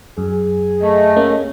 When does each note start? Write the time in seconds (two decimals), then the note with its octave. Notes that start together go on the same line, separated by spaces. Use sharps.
0.18 F#2 G#4
0.82 A3 D#5
1.16 A#3 C#4